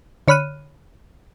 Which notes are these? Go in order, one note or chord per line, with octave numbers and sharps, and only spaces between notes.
D3 C#5 B5 F6 F#6 D#7